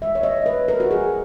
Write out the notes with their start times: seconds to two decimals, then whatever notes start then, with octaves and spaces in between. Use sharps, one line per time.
0.01 D#3 G#3 E5
0.15 C#5
0.23 D#5
0.46 B4
0.68 A#4
0.80 F#4
0.90 D#3 G#3 G#4